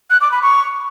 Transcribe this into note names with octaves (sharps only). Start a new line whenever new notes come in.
F#6
D6
B5
C#6